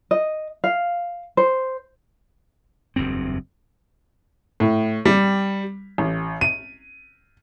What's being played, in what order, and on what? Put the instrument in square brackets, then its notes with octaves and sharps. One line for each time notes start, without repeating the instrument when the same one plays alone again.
[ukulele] D#5
F5
C5
[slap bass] F#1 E2 G2 C4
[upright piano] A2
G3
A1
D#7